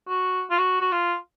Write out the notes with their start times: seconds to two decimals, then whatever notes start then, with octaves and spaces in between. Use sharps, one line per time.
0.08 F#4
0.50 F4
0.58 F#4
0.81 F#4
0.92 F4